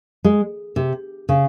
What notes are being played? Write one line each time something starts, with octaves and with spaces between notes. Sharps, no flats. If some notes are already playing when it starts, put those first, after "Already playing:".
G#3
C3
C#3